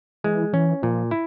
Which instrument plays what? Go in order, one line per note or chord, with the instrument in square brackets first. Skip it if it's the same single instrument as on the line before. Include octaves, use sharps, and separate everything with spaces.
[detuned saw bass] E3 [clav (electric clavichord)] G#3
[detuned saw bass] E3 [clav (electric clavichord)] C#4
[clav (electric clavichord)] A#2 [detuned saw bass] F3
[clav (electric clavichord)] E4